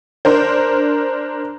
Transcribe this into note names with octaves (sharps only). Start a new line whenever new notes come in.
D4 A#4 C5